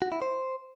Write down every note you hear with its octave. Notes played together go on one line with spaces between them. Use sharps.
F#4
E4
C5